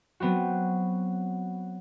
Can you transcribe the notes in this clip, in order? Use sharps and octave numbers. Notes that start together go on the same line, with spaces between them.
F#3 B3 C4 F#4